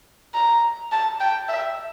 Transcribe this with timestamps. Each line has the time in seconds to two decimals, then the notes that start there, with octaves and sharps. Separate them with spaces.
0.34 A#5
0.92 A5
1.20 G5
1.49 E5